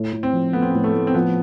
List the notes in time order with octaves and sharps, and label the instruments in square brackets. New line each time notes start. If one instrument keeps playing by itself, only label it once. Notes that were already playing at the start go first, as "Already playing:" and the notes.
Already playing: [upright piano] A2
A2
[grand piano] C4
[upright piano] F3
[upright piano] A3 [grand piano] B3
[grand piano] C4
B3
[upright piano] A2
[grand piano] A3
[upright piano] A2
[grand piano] C4
[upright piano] F3 [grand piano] B3